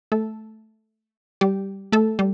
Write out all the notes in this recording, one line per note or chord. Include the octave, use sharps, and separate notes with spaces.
A3 A4
G3 G4
A3 A4
G3